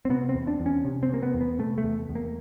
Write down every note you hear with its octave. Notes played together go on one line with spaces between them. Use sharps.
C4
C3 B3
C4
E2
D4
E2
C#4
C3
C4
C3 A#3
B3
E2
B3
C3 A3
A3
E2
E2
A#3